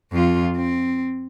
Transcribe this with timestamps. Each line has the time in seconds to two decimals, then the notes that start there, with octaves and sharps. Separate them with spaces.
0.12 F2 F4
0.56 C4